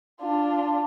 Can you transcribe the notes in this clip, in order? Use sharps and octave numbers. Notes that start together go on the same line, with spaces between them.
D4 F4